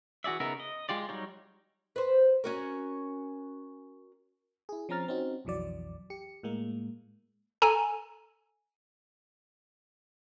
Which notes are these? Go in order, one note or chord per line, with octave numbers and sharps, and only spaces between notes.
E3 F#4 G#4 D5 E5
C#3 B3 D#4 A#4 E5
D#5
G#3 F4 G4 D5
F#3 G3 D#4 C#5
B4 C5
C#4 F#4 A#4
E4 G#4
F3 C4 C#4 A#5 F6 A6
C4 C#4 D#4 F#4
B1 F2 E3 F#3 D5
G4 C#7
A2 G#3 A#3
A4 G#5 A#5